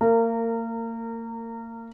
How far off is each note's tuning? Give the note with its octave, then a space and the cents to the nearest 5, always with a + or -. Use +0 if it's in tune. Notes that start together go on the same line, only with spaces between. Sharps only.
A#3 -35 A#4 -25